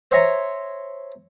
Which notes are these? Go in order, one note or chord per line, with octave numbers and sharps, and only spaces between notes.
C5 C#5 E5 G#5 A#5 C#6